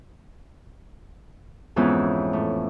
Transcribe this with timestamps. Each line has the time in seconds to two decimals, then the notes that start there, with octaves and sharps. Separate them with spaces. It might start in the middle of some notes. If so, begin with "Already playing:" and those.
1.76 F2 G#2 E3 B3 C#4
2.33 A2